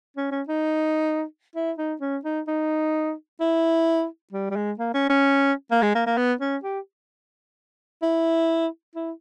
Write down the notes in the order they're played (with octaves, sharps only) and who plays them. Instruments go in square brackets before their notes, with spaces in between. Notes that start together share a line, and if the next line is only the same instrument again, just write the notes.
[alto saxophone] C#4
C#4
D#4
E4
D#4
C#4
D#4
D#4
E4
G3
G3
G#3
A#3
C#4
C#4
A#3
G#3
A#3
A#3
B3
C#4
G4
E4
E4